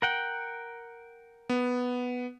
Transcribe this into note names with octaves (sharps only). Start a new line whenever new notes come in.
A#4 F#5 G5
B3